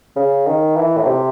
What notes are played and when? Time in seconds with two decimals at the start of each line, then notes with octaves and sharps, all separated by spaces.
0.16 C#3
0.47 D#3
0.76 E3
0.97 A2
1.05 C3